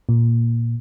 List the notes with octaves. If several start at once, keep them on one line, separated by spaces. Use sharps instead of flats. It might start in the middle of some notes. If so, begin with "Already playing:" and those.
A#2